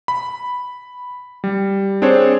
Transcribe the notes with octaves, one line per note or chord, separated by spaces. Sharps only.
B5
G3
C4 D4 G#4 C5 C#5